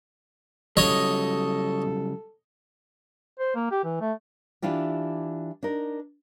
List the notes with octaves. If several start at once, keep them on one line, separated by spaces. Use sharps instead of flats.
C#3 F#3 G3 A4 C#5 D#5
C5
A#3
G4
E3
A3
E3 D4 E4 F4 G4
D4 D#4 A#4